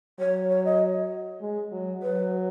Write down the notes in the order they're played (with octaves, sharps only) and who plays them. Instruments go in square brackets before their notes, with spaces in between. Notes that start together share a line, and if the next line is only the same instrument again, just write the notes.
[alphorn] F#3 [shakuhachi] C#5
[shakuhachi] C#5
D#5
[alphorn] G#3
F#3
[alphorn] F#3 [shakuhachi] B4